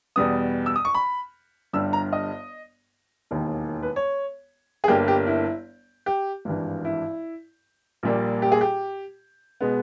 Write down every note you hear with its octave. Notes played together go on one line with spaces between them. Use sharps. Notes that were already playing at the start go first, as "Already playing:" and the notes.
E2 B2 G3 B3 D#6
E6
D#6
C#6
B5
G1 G2 G3 E6
A#5
D#5
E1 D#2 D#3
B4
C#5
G#4
G1 G2 G3 A#3 G4
G4
E4
G4
G#1 G2 E3
E4
A#1 A#2 G3 A#3
G4
G#4
G4
B2 G#3 B3